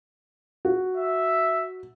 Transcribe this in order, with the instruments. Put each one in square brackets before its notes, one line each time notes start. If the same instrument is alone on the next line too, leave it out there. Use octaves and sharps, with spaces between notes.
[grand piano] F#4
[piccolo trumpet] E5